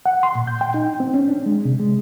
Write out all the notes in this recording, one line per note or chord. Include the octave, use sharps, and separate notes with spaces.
F#5
C6
A#2
G6
G5
D#4
C4
C#4
D4
G#3
C3
G#3